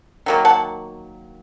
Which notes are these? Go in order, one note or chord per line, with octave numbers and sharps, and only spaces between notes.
D#3 F#3 A#3
F#5 A5